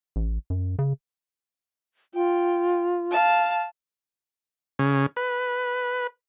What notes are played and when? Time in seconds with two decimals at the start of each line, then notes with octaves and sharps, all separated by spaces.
0.16 A1
0.50 F#2
0.79 C#3
2.14 F4 G5
3.11 F5 A5
4.79 C#3
5.17 B4